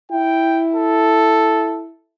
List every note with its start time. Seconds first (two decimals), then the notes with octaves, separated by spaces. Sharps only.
0.11 E4 G5
0.74 A4